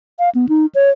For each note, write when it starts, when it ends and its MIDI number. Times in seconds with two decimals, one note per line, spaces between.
0.19 0.30 77
0.35 0.46 59
0.49 0.66 63
0.75 0.90 73